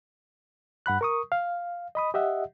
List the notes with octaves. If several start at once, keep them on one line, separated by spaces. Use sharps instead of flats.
G2 F#5 B5 F#6
A#4 C#6 D#6
F5
D#5 B5 D#6
G4 D#5 E5 F#5